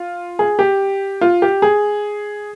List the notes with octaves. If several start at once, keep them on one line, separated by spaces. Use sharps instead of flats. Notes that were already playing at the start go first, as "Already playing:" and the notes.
Already playing: F4
G#4
G4
F4
G4
G#4